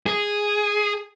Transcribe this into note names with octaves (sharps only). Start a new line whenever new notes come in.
G#4